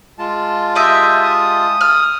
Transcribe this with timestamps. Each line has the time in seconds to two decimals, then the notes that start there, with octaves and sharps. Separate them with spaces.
0.18 G#3 F4 A5
0.75 G4 D#5 E5
1.22 D#6
1.81 F6